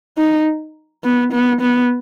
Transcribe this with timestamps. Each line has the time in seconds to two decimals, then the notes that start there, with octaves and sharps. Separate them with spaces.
0.18 D#4
1.04 B3
1.33 B3
1.61 B3